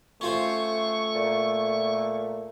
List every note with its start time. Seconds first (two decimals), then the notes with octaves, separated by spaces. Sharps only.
0.21 A3 C#4 F4 C5 C#6
1.15 A#2